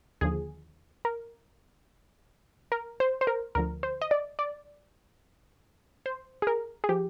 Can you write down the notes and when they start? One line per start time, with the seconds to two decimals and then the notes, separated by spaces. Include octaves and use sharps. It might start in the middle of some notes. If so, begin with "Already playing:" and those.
0.21 D#2 D3 F3 G#4
1.05 A#4
2.72 A#4
3.00 C5
3.21 C5
3.27 A#4
3.55 D2 D3 F3 A#4
3.83 C5
4.02 D#5
4.11 D5
4.39 D5
6.06 C5
6.42 G#4
6.47 A#4
6.84 G#4
6.89 F3 G4